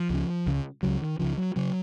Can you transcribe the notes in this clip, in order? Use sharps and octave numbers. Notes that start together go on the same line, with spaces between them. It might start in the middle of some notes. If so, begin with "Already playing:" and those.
Already playing: F3
C#2 C#3
C#2 C#3
C#2 C#3 F#3
D#3
C#2 C#3 F3
F#3
C#3 F#3